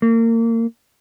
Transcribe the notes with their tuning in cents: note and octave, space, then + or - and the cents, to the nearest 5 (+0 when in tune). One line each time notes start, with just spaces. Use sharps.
A#3 -30